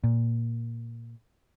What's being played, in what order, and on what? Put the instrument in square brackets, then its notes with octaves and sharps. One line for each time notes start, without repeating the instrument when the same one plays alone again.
[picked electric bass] A#2